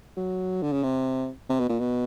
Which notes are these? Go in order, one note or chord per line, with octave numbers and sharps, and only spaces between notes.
F#3
D3
C#3
C3
C3
B2
A#2
B2